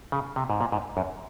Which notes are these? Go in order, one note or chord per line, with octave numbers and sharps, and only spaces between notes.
C#3
C3
G#2
A#2
G#2
F#2